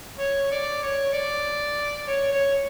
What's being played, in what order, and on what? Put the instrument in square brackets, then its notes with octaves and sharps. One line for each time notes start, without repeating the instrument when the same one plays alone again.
[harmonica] C#5
D5
C#5
D5
C#5
C#5